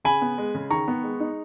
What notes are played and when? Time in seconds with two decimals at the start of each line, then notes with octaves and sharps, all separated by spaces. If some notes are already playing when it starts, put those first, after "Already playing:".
0.04 C#3 G#5 B5
0.22 B3
0.38 G#3
0.55 C#3
0.71 D#3 A#5 C#6
0.88 B3
1.03 G#3
1.20 D#4